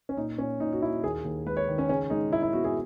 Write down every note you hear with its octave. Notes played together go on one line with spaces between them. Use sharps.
C#4
A#2 D#4
A#2 C#4
A#2 D#4
F#4
A#3 E4
D#2 G#4
D#2
G#3 B4
C#5
D#3
C#4
C#3 C#4
G#3 D#4
G#3 E4
E4
B3 F#4
G#4